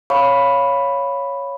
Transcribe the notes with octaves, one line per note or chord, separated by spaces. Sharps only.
C#5 F5 B5 C#6